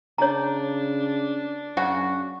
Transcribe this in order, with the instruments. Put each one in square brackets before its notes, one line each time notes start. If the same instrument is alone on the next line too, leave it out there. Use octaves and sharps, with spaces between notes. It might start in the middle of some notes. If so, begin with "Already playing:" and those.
[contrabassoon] C#3 [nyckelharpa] D4 [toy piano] C#5 A#5
[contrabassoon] F#2 [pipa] C#3 F#4 C#6 [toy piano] F#5